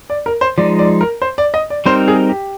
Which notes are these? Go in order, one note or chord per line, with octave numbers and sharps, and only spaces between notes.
D5
A#4
C5
F3 G#3 D#4 D5
D5
A#4
C5
D5
D#5
D5
G3 C4 D#4 A#4 C5
G#4
G4